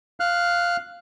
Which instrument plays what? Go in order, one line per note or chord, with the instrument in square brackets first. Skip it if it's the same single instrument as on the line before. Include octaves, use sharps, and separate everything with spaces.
[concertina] F5 F6 F#6